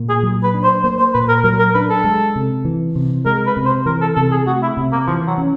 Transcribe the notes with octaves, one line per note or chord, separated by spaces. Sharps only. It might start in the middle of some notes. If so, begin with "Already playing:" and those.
Already playing: A#2 A#3
G#4
F#3
B4
D4
C5
A#3 C5
C5
A#2 B4
A#4
F#3 A#4
A#4
D4 B4
A4
G#3
C3
E3
C3
G#3 A#4
B4
C3
C5
E3 A#4
A4
C3 A4
G#4
A3 F#4
E4
C3
A#3
E3 F3
F#3
C#4